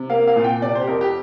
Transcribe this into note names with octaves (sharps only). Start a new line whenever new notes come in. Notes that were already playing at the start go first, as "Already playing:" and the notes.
Already playing: C3
A#3 F5
F5
A#2
G5
C3 D5
C5
G4
F2 A#4
G4